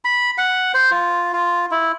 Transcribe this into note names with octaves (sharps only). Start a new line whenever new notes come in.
B5
F#5
C5
F4
F4
E4